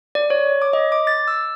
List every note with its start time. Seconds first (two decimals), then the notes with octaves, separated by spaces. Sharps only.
0.15 D5
0.30 C#5
0.62 D6
0.73 D#5
0.92 D6
1.07 A6
1.28 E6